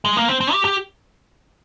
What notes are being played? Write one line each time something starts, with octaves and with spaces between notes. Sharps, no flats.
G#3
A#3
C4
C4
G4
G4